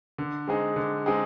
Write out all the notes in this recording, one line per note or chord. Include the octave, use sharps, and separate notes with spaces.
D3
G#3 C4 D#4 G#4
D3
G#3 C4 D#4 G#4